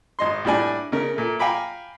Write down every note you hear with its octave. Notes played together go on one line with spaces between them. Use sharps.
G#1 D#5 C6
A2 G3 D4 G#5
C#3 A#4
A#2 A3
F5 G5 G#5 A#5 B5 D6